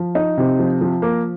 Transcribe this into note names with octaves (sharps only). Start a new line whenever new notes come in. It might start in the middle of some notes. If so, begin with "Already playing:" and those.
Already playing: F3
D#4
C3
F3
F3
A#3